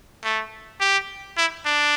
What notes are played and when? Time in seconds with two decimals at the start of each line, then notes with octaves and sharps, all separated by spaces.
0.24 A3
0.80 G4
1.37 E4
1.65 D4